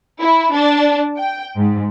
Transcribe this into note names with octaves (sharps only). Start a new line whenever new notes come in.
E4
D4
G5
G#2